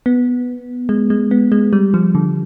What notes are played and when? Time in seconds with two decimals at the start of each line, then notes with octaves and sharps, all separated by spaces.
0.06 B3
0.89 G#3
1.10 G#3
1.31 B3
1.52 G#3
1.73 G3
1.94 F3
2.15 D3